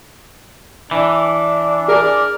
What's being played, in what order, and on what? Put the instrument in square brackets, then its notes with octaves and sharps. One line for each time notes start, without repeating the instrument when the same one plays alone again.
[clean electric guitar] E3 [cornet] D4
[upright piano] G#4 [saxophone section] A#4 D5